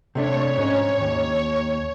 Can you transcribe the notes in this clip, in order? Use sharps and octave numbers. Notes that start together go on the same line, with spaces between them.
C3 A3 D4 C#5
G#2 C#4
D#2